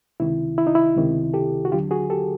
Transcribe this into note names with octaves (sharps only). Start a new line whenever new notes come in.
C#2 C3 D#3 E4
E4
D#4
E4
C#2 C3 D#3
G4 A4
F#4
D#2 D3 F#3 F4 G4
F#4 G#4
G4 A4